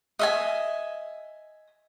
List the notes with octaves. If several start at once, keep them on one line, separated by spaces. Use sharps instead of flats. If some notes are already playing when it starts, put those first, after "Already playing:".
D#5 E5 G#5